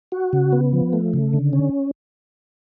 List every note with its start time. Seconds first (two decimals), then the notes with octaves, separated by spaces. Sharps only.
0.12 F#4
0.33 C#3
0.53 B3
0.73 F3
0.93 A3
1.14 C#3
1.33 D3
1.53 C#4